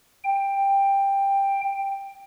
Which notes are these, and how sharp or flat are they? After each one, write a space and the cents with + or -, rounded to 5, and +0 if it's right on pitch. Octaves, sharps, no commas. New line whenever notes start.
G5 +10